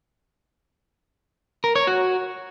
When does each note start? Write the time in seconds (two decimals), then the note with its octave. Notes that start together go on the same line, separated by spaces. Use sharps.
1.64 A#4
1.76 C#5
1.87 F#4